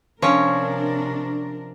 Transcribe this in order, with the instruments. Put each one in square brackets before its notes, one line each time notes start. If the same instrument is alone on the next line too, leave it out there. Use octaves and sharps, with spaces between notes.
[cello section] C3 D4 A#4 [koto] F3 C#4 [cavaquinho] C#5